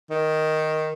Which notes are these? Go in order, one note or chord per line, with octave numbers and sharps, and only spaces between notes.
D#3